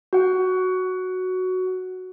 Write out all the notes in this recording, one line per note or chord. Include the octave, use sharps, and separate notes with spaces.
F#4 F#5